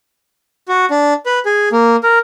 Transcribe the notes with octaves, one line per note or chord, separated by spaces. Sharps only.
F#4
D4
B4
G#4
A#3
A#4